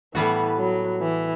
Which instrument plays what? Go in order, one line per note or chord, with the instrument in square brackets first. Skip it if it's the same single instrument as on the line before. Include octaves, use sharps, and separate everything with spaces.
[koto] A2 G3 B3 F#4 [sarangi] E3
[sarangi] F#3
E3